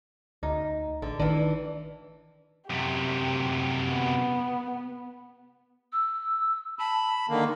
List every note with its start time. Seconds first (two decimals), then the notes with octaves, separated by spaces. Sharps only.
0.43 D2 D#4
1.02 A1 D3
1.19 D#3 E3 D4
2.70 F#2 C3 G4
3.91 B3
5.92 E6
6.79 A5 B5
7.29 D3 D#3 A#3